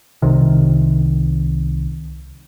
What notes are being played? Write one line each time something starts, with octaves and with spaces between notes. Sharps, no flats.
C2 C3 D#3